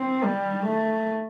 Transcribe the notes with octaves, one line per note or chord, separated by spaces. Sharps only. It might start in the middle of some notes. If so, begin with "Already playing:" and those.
Already playing: C4
G3
A3